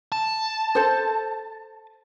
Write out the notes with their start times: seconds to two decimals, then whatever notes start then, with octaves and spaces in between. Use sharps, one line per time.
0.12 A5
0.75 A4 C5